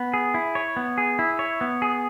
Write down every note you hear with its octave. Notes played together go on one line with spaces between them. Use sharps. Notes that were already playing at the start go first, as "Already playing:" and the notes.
Already playing: B3
G#4
E4
C#5
B3
G#4
E4
C#5
B3
G#4